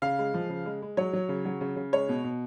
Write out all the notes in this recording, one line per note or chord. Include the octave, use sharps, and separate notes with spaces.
C#3 F5
G#3
F3
C#3
G#3
G#3
F#3 C#5
F#3
C#3
F#3
C#3
C#3
G#3 C#5
B2
B2